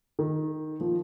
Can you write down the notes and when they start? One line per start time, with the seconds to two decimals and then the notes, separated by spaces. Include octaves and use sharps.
0.19 D#3
0.81 F3